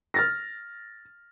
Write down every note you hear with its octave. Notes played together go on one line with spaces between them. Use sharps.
F6 A6 A#6